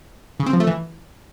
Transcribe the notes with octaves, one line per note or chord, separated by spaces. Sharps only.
C#3
C4
F3
A3
E3